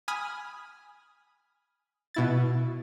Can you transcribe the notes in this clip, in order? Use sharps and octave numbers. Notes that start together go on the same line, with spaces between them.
G#5 B5 D#6 F6
B2 E4 A6